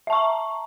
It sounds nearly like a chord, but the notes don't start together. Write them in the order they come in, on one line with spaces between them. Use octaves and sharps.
E5 A5 C#6 A#5